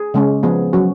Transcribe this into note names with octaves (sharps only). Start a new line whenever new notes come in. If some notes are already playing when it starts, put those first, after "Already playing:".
Already playing: G#4
C#3 G#3 C#4
F3 B3 G#4
F#3 C#4 F#4